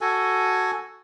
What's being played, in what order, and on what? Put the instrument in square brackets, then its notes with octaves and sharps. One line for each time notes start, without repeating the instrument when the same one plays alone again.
[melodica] F#4 A4 G#5